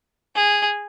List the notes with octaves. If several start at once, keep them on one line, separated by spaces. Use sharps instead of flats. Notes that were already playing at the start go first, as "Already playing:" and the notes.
G#4